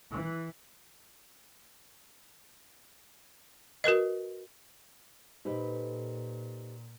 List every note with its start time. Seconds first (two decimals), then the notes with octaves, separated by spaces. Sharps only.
0.11 E3
3.84 F#4 A#4 B4 D#5
5.45 A#2 D#4 G4 A4 B4 C5 D#5